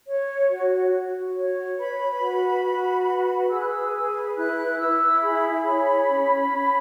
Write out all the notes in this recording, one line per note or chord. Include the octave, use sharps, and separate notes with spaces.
C#5
F#4
F#4
C#5
B4 B5
F#4
F#4
B4
G#4 E6
F#6
E6
B4
E4 F#6
E4 E6
G#4 B5
C#5
C#4
C#4